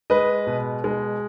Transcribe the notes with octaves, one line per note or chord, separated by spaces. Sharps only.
G#3 B4 D#5
B2
G#3